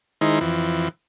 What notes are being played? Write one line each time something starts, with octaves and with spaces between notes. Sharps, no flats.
D#3 G#3 D#4 E4 C5
F2 E3